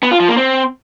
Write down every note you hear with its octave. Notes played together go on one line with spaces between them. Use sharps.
B3
F4
F3
A#3
C4